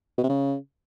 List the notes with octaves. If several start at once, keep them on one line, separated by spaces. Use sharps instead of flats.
B2
C3
C#3